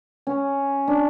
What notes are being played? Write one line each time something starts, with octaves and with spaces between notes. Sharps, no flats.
C#4
D4